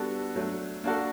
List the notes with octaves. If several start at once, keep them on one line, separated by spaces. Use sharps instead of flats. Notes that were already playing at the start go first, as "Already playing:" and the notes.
Already playing: G3 B3 D4 F#4 A4
F#3 A3 D4
A#3 D4 F#4 A4